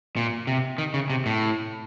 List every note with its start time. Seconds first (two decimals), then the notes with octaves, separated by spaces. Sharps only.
0.17 A#2
0.47 C3
0.78 D#3
0.94 C#3
1.10 C3
1.26 A2